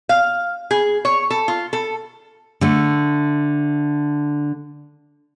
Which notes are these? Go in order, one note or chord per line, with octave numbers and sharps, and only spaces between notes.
F5
G#4
C#5
A4
F4
A4
D3 A3